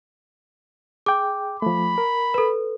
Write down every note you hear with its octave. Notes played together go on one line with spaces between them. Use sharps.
G#4 G5 D6
F3 A3 B5
A#4
A4 B4